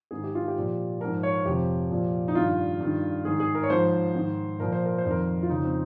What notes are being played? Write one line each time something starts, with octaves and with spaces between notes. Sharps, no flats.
G#2 D#3 G#4
G4
F4
G4
A#2 F3
G#2 F3 A#4
C#5
F2 C3 F3 G4
A#2 F3
D#4
G2 D#3 F4
G2 D#3
G#2 D#3 G#4
G#4
A#4
C#5
G#2 F3 C5
G#2 D#3
A#2 F3 A#4
C5
A#4
C5
F2 D#3
A#4
F4
F2 C#3 F3 D#4
C4